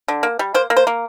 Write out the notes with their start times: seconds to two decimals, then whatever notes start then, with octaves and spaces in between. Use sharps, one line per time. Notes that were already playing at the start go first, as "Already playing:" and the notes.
0.08 D3
0.23 A#3
0.39 G3
0.54 A#3 C5
0.70 A#3
0.77 C5
0.87 A#3